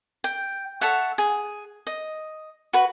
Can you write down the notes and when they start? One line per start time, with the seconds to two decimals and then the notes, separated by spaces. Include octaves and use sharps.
0.24 G5
0.81 A4 C#5 E5 F#5
1.18 G#4
1.87 D#5
2.73 F#4 B4